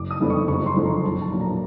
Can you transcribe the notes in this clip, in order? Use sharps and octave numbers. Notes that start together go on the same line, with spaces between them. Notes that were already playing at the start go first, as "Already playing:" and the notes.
Already playing: F#1 D6
D#6
F2 D3 G3 B3
C#6
F#1 C#6
C6
F2 D3 F3
A#5
B1 A5
A5
A#2 F#3 A#3 D4
A#5